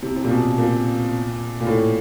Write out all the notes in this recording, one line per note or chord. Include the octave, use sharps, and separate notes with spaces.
C3
C3
A#2
B2
B2
A#2
A#2
A2